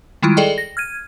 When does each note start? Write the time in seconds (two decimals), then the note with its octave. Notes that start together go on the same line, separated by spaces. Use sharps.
0.22 D#3 G3 G#3 E4 F4
0.37 G#4 A4 D5 D#5 G5
0.58 A#6
0.77 F6 G#6 D#7